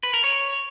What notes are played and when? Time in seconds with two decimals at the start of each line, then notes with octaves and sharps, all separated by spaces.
0.03 B4
0.14 A#4
0.24 C#5